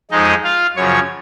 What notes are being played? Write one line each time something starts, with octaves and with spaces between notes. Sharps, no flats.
F2 F3 G#3 D#4 D#5
F4 F5
F#2 C#3 F3 C#5 C#6